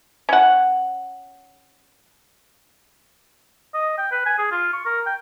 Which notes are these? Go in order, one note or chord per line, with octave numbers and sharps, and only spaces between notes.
C#4 F#5
D#5
G5
B4
G#5
G#4
F4
C#6
A#4
G5